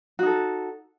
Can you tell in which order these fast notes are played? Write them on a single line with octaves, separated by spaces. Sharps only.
F#4 D#4 A4